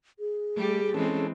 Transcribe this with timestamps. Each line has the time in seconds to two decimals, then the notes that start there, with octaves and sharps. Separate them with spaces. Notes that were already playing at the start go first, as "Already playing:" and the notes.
0.19 G#4
0.57 G3 A3 G4
0.94 E3 G#3 C4 C#4 A4